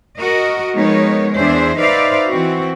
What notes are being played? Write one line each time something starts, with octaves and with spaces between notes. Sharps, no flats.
F#4 A#4 D#5
F3 G#3 B3 D#4 A#4 C#5
E2 D4 G#4 C5 E5
D#4 B4 C5 D5 E5 F5
E3 C4 F#4